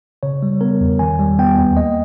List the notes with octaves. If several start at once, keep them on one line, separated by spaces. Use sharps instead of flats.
C#3 C#5
G3
B3 A#4
E2
D#3 G#5
G3
B3 G5
D#2
A#3 D#5